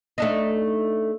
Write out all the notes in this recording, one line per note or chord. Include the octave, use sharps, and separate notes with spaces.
A3 D4 D#4